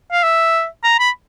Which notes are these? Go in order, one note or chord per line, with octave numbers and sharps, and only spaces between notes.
F5
E5
A#5
B5